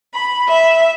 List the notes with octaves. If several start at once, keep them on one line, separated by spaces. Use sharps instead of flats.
B5
E5